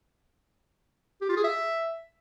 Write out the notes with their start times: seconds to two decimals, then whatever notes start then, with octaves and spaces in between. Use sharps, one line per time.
1.22 G4
1.29 F4
1.37 G#4
1.44 E5